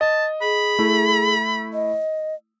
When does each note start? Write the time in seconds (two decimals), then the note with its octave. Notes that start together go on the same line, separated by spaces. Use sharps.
0.01 D#5 A5
0.42 G#4 B5
0.79 A3 E4
1.73 D#5